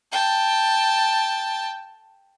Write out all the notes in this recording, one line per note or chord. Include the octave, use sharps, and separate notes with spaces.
G5 A5